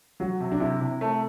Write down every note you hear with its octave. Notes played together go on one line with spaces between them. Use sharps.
F#3 F#4
C3
D4
C3 E4
C3
A3